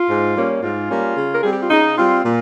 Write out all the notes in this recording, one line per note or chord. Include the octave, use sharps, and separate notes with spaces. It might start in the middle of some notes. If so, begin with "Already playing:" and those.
Already playing: F4
G#2
G3 A#3 C#4
G#2 F4
G3 A#3 C#4
C#3
A#4
G3 C4 G#4
G4
F4
C#3 D#4
G3 C4 F4
A#2 F4